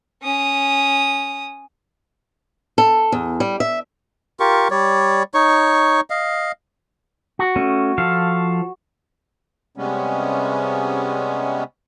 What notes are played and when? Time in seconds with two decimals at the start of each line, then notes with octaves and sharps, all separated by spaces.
0.23 C#4 D#6
2.78 A4
3.12 E2
3.40 G3
3.60 E5
4.40 F4 G4 A#4 C#6
4.71 G3 C#5 D5
5.34 D#4 C#5 C#6
6.10 D#5 F5
7.39 F#4
7.56 A3 C#4
7.98 F3 A4 F5
9.76 C3 G3 G#3 B3 C#4